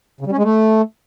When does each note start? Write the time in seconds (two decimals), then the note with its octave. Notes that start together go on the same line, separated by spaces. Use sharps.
0.21 C#3
0.26 G3
0.32 C#4
0.38 G#3
0.43 A3